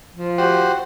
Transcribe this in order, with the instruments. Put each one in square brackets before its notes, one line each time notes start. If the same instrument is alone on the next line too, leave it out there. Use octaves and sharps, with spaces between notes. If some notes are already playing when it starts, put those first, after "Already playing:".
[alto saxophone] F3
[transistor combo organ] F#4 C5 [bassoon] G4